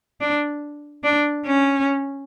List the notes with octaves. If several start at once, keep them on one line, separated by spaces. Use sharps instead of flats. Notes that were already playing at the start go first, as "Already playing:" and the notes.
D4
D4
C#4